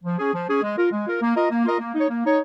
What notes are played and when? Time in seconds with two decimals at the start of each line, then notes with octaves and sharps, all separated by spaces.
0.04 F3
0.19 C#4 G#4
0.33 F3
0.48 C#4 G#4
0.62 G#3
0.77 F4 A#4
0.92 G#3
1.06 F4 A#4
1.21 A#3
1.36 F4 A#4 D#5
1.51 A#3
1.65 F4 A#4 D#5
1.80 A#3
1.95 D#4 C#5
2.09 A#3
2.24 D#4 C#5